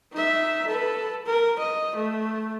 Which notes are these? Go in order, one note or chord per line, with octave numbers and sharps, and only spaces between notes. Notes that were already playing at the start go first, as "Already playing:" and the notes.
D#4 E5
A4 B4
A#4
D#5
A3